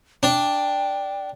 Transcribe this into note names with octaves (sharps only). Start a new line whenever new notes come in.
D4 G5